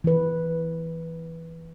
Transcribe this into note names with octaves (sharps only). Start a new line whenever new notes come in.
E3 B4